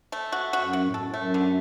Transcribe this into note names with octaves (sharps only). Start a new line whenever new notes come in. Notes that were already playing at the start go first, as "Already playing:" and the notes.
A3
F#4
F#4
F#2
F#4
A2
B2 A4
A2
F#2 A3
D3